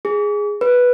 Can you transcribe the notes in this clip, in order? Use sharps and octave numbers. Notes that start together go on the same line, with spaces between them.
G#4
B4